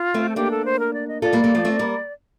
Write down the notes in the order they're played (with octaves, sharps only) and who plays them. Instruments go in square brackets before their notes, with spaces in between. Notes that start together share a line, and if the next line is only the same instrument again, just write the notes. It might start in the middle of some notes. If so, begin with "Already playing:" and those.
Already playing: [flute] F4
[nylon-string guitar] A3 C4
[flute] A4
[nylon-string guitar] A#3 D4 [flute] G4
[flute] A4
C5
A#4
D5
D#5
[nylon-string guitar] F4 A4 [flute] D5
[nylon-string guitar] G3 A#3
G3 A#3
F3 A3
A3 C4
G3 A#3